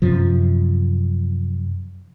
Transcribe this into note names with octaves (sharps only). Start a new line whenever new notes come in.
F#2 C3 F3